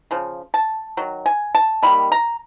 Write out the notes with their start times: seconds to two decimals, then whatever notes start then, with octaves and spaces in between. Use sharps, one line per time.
0.11 C#3 F3
0.54 A5
0.97 D#3 F#3
1.26 G#5
1.55 A5
1.83 D#3 G3 A#3 B5
2.12 A#5